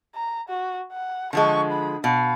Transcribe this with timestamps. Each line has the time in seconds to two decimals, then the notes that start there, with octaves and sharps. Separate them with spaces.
0.15 A#5
0.49 F#4
0.92 F#5
1.33 D3 F3 G#3 C#6
1.72 B5
2.04 B2 F5